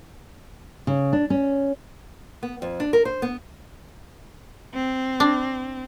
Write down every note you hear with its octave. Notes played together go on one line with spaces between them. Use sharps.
C#3
D4
C#4
B3
F2
D4
A#4
C5
B3
C4
D4